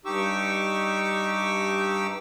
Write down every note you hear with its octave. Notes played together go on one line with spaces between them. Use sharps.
G2 D#4 G4 C#6 D6 E6